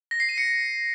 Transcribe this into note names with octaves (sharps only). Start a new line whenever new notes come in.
A#6
C7
D#7
C#7